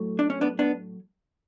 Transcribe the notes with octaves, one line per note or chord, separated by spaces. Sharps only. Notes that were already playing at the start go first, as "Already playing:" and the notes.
Already playing: A2 F#3 A3
D4
C#4
B3 D4
B3 D4